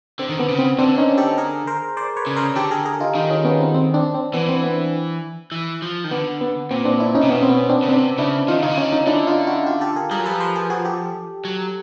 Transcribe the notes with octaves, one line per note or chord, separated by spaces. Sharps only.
D3 C4
D#3
D3 B3
C#3
C4
D3 C4 D4
C#4 D#4
G4 A4
G#4 A#4
A#4 C5
C5 D5
B4 C#5
C#3
A#4 C5
D3 G4 A4
G#4 A#4
G#4 A#4
D#4 F4
D#3 D#4 F4
C#4 D#4
B3 C#4
C4
C4
C4 D4
C4
E3 B3
C4
B3
E3
F3
D#3
D3 B3
B3
A#2 C4
C4 D4
D4 E4
C#4 D#4
C3
B2 B3 C#4
C4
B3 C#4
C4 D4
C#3
C3 C4 D4
C#3 D4 E4
D#3 D#4 F4
D3
C#3 D#4 F4
D3
C#4 D#4
C#4 D#4
D3 D4 E4
D#4 F4
E4 F#4
F4 G4
G4 A4
G#4 A#4
G3 G#4 A#4
F#3
F3 A4 B4
A#4 C5
G#4 A#4
F#4 G#4
G4 A4
F#3